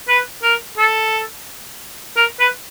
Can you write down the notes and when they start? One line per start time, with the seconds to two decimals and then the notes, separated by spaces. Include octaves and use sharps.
0.08 B4
0.43 A#4
0.78 A4
2.17 A#4
2.40 B4